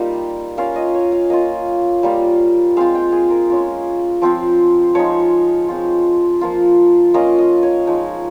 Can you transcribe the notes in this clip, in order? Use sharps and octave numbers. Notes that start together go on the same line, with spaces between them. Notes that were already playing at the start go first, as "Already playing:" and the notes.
Already playing: G3 A#3 D#4 F4
A#3 C#4 F4 F5
D#5
C#5
F5
A#3 F4 D#5
G3 A#3 F4
G#3 C4 F4 F5
G5
G#4
A#4
G#3 C#4 F4
F3 C4 F4
F3 G#3 D#4 C#5
G#3 C4 F4
F3 A#3 F4
A#3 C#4 F4 D#5
D#5
C#5
F3 G#3 D#4